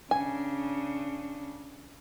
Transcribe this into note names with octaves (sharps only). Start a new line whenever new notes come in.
C#3 D4 G#5